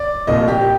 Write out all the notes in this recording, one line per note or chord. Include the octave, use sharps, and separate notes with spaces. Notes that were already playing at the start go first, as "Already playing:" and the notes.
Already playing: D5
C2 A#2 F3 D#5
G4